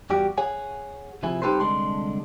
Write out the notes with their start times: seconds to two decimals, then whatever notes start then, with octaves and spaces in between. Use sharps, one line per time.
0.10 E2 G3 F#4 G4
0.38 G#4 C#5 F#5 G#5
1.23 C3 F3 E4 G#4
1.42 C2 D#4 G4 A4 B4 C5
1.60 C2 D3 G#3 A5 C6